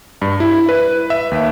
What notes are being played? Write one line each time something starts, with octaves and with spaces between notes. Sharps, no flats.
G2
E4
B4
E5
D#2